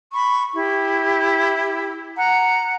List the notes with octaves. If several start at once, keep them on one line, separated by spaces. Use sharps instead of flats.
B5 C#6
E4 G4
F#5 A#5